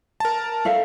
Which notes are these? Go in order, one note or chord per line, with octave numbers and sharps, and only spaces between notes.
A#4 A5
A4 E5 F5